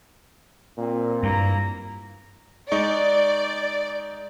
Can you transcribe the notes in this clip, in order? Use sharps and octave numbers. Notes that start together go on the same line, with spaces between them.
A#2 C4
G2 A#3 E4 A#5
G#3 D#4 D5 C#6